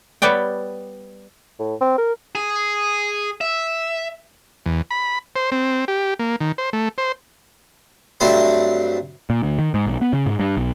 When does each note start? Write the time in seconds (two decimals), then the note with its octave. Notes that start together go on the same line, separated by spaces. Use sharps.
0.22 G3 B3 C#5 D5 G5
1.59 A2
1.81 C4
1.98 A#4
2.35 G#4
3.41 E5
4.66 E2
4.91 B5
5.36 C5
5.52 C4
5.88 G4
6.19 A#3
6.40 D#3
6.58 C5
6.73 A3
6.98 C5
8.20 G2 F#3 A3 C4 C5 B5
9.30 A#2
9.43 D2
9.59 D#3
9.74 G#2
9.87 B1
10.01 B3
10.13 C#3
10.26 G#2
10.39 G2
10.57 B1